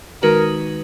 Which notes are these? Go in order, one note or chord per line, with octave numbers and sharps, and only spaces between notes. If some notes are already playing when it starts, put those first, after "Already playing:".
D#3 G#3 D#4 F#4 A#4 B4